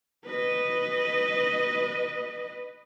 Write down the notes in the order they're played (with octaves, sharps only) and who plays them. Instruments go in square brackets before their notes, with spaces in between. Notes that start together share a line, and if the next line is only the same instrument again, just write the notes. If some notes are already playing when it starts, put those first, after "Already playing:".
[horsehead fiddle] B4 D#5